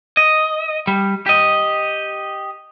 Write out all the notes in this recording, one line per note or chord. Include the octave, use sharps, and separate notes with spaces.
D#5
G3
G4 D#5